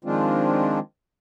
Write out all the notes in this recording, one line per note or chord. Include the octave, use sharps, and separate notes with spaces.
D#3 F3 G#3 C4 D4 F4